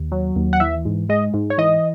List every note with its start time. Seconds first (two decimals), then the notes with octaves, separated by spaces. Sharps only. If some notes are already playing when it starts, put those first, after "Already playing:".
Already playing: D#2
0.12 F#3
0.36 D#2
0.53 F#5
0.60 E3 E5
0.85 G#2
1.09 G#3 D#5
1.34 G#2
1.50 C#5
1.58 E3 D#5